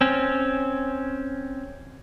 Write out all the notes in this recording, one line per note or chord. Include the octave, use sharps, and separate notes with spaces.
C4 C#4